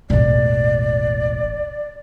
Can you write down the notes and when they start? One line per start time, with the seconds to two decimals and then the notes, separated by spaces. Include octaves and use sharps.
0.10 E1 A1 D5